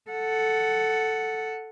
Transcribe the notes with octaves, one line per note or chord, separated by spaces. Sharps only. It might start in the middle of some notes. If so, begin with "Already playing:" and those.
A4 F#5